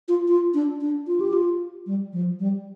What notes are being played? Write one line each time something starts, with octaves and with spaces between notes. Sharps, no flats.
F4
F4
D4
D4
F4
G4
F4
G3
F3
G3